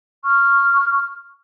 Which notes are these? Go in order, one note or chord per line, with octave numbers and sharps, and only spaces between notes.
C#6 F6